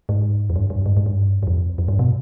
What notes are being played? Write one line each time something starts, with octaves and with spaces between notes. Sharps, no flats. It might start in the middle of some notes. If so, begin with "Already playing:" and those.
G#2
F2
G2
G2
G#2
G#2
G2
G2
F2
F2
G2
B2